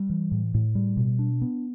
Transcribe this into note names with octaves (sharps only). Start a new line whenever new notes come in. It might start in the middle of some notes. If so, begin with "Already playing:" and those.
Already playing: G3
E3
A2
A2
G3
B2
D4
B3